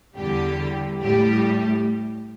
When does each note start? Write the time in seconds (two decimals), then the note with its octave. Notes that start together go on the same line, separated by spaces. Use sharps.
0.16 E2 D3 G3 G4
1.01 A2 G3 G4